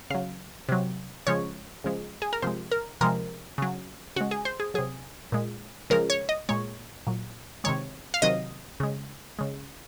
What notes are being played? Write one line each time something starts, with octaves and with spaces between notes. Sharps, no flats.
C#3 F#3 F5
C3 F#3
C#3 F3 G#3 C#5
C#3 F3 G#3
G#4
A#4
C3 F3 G#3 C5
A#4
C3 F3 G#3 A#4
C#3 F#3
C#3 G#3 F#4
G#4
C5
G#4
C3 F#3 G#4
A#2 G#3
C#3 F3 G#3 A#4
C#5
D#5
A#2 G#3 C#5
A#2 F#3
C3 D#3 G#3 C#5
F5
C3 D#3 F#3 D#5
C#3 G#3
C#3 G#3